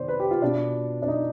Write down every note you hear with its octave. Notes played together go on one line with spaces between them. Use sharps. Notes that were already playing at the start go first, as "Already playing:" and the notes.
Already playing: C3 D#3 B3 C5 D5
B4
G4
F4
B2 B3 D4
D4
D#4